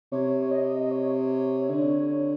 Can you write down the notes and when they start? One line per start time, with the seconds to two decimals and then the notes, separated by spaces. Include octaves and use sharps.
0.12 C3 C#5
0.51 D#5
0.91 C#5
1.70 D3